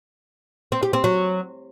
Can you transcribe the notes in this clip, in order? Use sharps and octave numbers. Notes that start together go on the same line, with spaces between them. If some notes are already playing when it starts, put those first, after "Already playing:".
C4
G4
C4
F#3